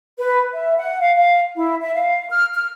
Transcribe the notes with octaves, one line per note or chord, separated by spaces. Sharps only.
B4
E5
F#5
F5
F5
E4
E5
F5
F6
F6